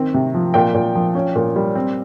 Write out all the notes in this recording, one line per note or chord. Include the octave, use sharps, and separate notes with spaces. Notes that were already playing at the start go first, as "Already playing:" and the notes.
Already playing: D#3 C4
C3
F3
A#2 G5
A#2
F3
C#4
A#2
G3
C4